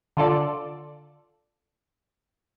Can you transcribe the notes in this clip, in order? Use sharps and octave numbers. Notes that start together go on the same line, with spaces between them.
D3 F4 A4 D5